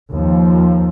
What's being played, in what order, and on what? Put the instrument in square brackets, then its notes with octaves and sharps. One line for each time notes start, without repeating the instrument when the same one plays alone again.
[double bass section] D#2 F3